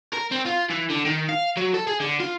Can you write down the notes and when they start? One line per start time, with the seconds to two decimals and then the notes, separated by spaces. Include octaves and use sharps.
0.13 A#4
0.31 C4
0.45 F4
0.70 E3
0.90 D3
1.05 D#3
1.29 F5
1.57 F#3
1.74 A4
1.87 G#4
2.00 D3
2.20 F4